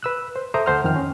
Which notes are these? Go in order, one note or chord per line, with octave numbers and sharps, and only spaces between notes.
B4 E6 F#6
C5
A4 C5 E5 A#5 D6 D#6
D2 A4 C5 F#5 F6
F2 D#3 G5 F6
C#4